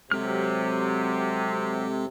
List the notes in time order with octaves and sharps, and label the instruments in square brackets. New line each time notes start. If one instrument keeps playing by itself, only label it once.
[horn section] C3 [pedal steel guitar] F#3 G4 F6 [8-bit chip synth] G#3 C4 A4